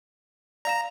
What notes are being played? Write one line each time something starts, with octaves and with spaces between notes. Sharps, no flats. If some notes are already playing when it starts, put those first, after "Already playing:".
D5 F5 A#5 E7